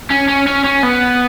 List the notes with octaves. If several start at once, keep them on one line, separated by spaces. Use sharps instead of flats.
C#4
C#4
C#4
C#4
B3